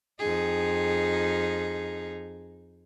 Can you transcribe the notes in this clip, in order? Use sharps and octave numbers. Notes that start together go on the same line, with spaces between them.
F2 D#4 G#4